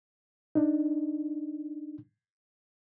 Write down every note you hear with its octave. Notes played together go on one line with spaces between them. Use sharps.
D4 D#4